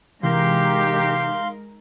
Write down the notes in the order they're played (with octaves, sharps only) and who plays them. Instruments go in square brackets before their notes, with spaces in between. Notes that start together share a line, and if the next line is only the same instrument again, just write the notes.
[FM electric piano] C3 E3 [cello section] G#3 D#4 A#4 [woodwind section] G4 [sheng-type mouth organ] F5 C6